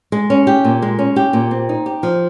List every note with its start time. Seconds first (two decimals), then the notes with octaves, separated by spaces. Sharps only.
0.12 G#3
0.30 C#4
0.47 G4
0.64 A#2
0.82 G#3
0.99 C#4
1.16 G4
1.33 A#2
1.51 C4
1.69 D#4
1.86 G4
2.03 F3